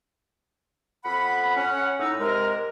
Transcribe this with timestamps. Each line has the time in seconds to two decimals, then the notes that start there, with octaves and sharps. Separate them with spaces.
1.04 F2 F#5 B5
1.56 C#4 F#5
1.99 A2 D#4 A#5 E6
2.19 C3 G#3 A#4